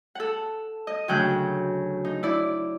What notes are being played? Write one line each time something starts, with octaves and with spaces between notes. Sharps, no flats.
A4 F#5
D#5
D2 C#3 F#3 G5 F#6
D#4
E4 D5